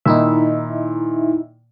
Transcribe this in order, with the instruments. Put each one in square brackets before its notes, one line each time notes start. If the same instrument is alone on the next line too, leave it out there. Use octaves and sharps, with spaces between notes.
[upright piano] A#2 D#3 [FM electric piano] D#4 E4 E5